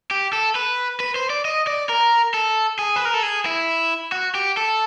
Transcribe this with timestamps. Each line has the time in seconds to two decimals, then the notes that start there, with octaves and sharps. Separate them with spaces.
0.11 G4
0.33 A4
0.55 B4
1.00 B4
1.16 C5
1.30 D5
1.45 D#5
1.67 D5
1.89 A#4
2.34 A4
2.79 G#4
2.96 B4
3.05 A#4
3.14 A4
3.23 G#4
3.46 E4
4.12 F#4
4.35 G4
4.57 A4